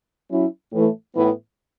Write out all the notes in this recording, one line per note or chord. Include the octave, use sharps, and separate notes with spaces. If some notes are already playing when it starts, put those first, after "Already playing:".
F#3 C#4 E4
A2 E3 A3
A2 E3 B3